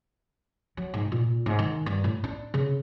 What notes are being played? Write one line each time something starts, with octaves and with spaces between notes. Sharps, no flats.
F#3
G#2
A#2
G#2
D#3
G2
A2
D4
C#3